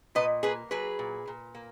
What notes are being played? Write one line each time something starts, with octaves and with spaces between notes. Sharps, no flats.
A#2 B4 D#5
A#3 G#4 B4
F#3 G#4 B4
A#2
A#2
A#3